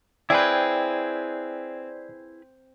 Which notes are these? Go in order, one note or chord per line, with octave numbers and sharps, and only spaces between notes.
C4 E4 G#4 B4 D5 G6